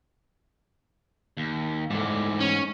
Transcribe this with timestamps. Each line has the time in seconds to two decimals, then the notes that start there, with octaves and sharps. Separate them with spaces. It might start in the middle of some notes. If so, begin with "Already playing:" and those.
1.37 D#2
1.90 G#2 E3 A3 D5
2.41 C#4